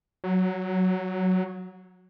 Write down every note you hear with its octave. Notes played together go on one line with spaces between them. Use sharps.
F#3